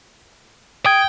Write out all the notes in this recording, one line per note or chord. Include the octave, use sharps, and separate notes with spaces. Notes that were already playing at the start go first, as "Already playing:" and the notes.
G5 D#6 G#6